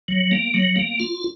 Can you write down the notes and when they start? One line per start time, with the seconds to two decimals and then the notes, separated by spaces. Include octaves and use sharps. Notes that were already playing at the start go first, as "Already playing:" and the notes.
0.08 F#3
0.31 A#3
0.54 F#3
0.76 A#3
1.00 F4